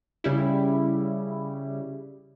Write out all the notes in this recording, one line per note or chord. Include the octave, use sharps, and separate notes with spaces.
C#3 G3 E4